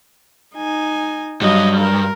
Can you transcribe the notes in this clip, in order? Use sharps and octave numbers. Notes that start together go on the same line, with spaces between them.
D#4 G#5
G2 F#3 D#5
A#4